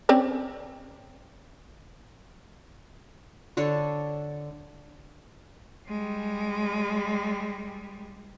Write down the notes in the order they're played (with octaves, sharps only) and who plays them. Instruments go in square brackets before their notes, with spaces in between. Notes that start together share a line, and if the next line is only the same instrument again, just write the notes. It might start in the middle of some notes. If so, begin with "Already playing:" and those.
[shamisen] C4 C#4 D5
[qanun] D3 D4 A4 C#5
[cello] G3 G#3